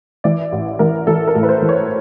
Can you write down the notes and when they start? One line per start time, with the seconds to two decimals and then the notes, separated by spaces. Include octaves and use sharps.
0.24 E3 D5
0.52 A1
0.79 E3 A#4
1.07 E3 A4
1.27 A#4
1.35 A2
1.43 B4
1.49 C5
1.62 E3
1.69 C#5